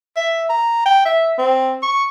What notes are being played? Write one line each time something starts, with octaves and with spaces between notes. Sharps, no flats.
E5
A#5
G5
E5
C4
C#6